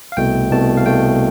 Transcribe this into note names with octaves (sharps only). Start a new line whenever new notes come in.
F5
C2 B2 A3 G5
C2 B2 A3 A5
F5
C2 B2 A3 G5